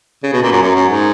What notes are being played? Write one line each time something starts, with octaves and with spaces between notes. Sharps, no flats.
C#3
B2
A#2
F#2
F#2
F#2
G#2